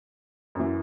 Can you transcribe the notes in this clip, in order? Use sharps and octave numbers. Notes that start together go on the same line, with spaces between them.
F#2 E3